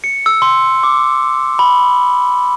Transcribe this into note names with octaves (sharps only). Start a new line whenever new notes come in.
C#7
E6
C6
D6
B5